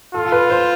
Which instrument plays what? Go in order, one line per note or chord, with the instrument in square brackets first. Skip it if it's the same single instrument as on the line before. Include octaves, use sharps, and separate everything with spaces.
[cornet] F4 [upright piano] A4
[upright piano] A4
B4
C5